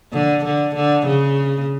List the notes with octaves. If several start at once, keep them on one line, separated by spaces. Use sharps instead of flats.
D3
D3
D3
C#3